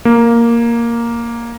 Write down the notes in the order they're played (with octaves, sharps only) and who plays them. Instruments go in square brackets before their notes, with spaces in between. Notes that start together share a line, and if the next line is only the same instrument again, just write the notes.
[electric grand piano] A#3